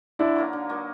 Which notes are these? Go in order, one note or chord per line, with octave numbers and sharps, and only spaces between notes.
D3 D4 E4
F#3 A#3 D#4
D3
F#3 A#3 D#4